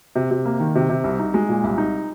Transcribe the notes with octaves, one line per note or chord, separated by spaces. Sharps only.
C3
C3
A#3
D#3
C3
C3
C2
D#4
G#3
A#2
C2
D#4